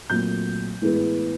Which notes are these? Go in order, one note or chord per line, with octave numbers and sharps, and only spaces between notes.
A#2 F#3 A3 C4 G6
A2 E3 G#3 B3